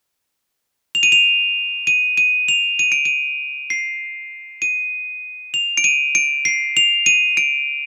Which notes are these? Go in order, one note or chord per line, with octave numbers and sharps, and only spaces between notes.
F7
D#7
F7
D#7
D#7
F7
D#7
D7
D#7
C7
D#7
F7
D7
D#7
D7
C7
F7
D#7
D7